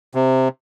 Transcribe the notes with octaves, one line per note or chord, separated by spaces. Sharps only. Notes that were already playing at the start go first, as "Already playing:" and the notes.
C3